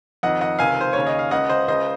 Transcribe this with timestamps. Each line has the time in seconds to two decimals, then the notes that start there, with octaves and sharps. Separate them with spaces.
0.23 F2 D#3 D#5 F#5
0.41 D#5 F#5
0.59 C#2 C3 D#3 F5 G#5
0.81 C5
0.93 D#2 C#3 C#5
1.07 D#5
1.19 F5
1.31 C#2 C#3 D#5 F#5
1.49 C5 D#5
1.68 C#2 C#3 C5 D#5